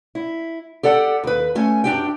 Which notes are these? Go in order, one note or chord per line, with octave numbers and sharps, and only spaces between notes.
E4
G4 A4 D5 F#5
D#2 B4
A3 C#4 G#5
F#2 D4 G4 G5